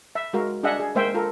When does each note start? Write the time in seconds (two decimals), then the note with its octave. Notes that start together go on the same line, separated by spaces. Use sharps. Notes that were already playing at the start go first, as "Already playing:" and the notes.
0.15 E5
0.33 G#3 F#4 A#4 F5
0.63 D4 G#4 D#5 E5 F#5
0.80 G#4
0.95 G#3 A#3 C5 E5 G5
1.14 F4 A4 A#4